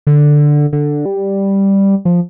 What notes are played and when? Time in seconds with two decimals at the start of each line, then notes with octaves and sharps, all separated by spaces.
0.07 D3
0.73 D3
1.05 G3
2.05 F3